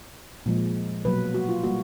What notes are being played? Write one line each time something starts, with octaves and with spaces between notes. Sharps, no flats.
A#2 F3 G#3
B2 F#3 A#3 B4
F#4
F4
G3 A#3 F#4